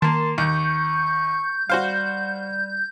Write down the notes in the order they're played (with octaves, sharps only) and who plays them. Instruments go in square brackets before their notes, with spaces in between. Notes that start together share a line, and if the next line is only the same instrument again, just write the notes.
[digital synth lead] D#3 [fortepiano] A#3 A5 [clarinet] C6
[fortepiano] D#2 [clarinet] C#6 [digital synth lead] G6
[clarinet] G3 [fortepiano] F#4 C5 F5